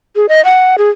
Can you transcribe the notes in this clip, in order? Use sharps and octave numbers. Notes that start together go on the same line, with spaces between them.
G#4
D#5
F#5
G#4